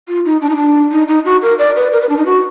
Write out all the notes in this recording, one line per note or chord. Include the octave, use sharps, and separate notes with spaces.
F4
D#4
D4
D#4
D4
D#4
D#4
F#4
A#4
D5
B4
A#4
B4
D4
D#4
F#4